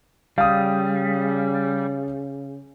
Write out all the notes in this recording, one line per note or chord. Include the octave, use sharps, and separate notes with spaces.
C#3 G3 F5 D#6